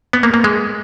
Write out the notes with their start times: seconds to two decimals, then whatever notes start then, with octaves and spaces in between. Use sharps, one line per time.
0.13 B3
0.23 A#3
0.34 A#3
0.44 G#3